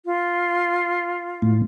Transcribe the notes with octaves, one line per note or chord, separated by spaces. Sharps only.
F4
A2